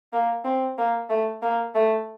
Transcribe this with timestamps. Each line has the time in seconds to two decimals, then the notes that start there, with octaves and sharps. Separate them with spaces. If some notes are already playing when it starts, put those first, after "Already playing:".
0.13 A#3
0.45 C4
0.78 A#3
1.10 A3
1.42 A#3
1.75 A3